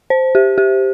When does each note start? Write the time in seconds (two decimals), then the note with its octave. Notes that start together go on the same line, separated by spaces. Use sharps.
0.10 C5
0.35 G4
0.58 G4